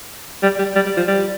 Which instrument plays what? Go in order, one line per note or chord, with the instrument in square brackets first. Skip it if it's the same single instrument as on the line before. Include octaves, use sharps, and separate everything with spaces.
[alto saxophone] G3
G3
G3
G3
F3
G3